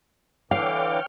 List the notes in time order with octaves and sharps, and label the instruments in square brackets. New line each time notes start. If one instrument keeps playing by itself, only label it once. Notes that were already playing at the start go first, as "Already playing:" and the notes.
[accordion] D3 E3 D6 [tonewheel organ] C#5 G5 F6 [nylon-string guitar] F5